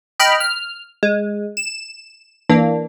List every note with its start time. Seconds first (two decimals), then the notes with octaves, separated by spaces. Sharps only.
0.20 D#5 G5 B5 F6
0.40 F6
1.03 G#3
1.57 E7
2.49 E3 A#3 D4